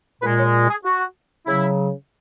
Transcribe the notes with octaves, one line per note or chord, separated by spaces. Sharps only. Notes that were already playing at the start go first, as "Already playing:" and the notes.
A#2 G#3 B4
C#5
G#4
F#4
C#3 F#3 E4